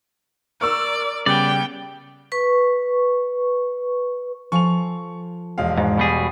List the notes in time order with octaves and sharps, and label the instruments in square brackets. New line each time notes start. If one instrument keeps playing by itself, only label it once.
[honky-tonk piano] A#4 C#6 E6 [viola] D5
[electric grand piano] C#3 G3 [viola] B3 G5 [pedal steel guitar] D5
[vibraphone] B4 C#6
[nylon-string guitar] F3 A4 G#5 [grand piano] C#6 F7
[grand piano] E1 G#3 F5
[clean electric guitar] G#2
B2 G3 G#4